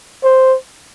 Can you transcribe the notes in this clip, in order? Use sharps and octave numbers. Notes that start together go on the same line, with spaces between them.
C5